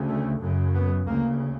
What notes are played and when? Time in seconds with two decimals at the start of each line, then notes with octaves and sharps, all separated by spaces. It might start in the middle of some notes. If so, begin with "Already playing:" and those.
Already playing: D2 C#3
0.08 A3
0.41 F#2 C#3
0.74 B3
1.07 D2 C#3 A#3